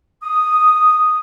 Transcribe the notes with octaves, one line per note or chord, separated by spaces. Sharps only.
D#6